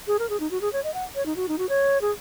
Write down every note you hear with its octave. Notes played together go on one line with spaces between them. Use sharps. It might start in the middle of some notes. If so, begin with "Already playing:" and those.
G#4
A#4
G#4
D#4
F#4
G#4
C#5
D#5
F#5
C#5
D#4
F#4
D#4
F#4
C#5
G#4